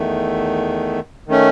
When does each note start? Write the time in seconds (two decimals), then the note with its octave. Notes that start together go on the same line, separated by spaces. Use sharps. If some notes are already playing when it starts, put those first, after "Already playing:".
Already playing: E2 D#3 A3
1.27 D#3 A3 C#4